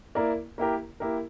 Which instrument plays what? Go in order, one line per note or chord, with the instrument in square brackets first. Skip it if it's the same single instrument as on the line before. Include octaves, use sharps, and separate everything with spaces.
[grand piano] A#3 E4 A#4 D5
A#3 E4 G4 A#4
A#3 E4 G4 A#4